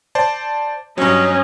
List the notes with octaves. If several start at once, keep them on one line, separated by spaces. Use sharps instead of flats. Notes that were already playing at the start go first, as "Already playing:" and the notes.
C5 D5 A5
G2 F#3 C#4 D#5